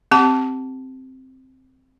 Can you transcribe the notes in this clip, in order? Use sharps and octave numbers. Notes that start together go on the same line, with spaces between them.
C4 G4 A5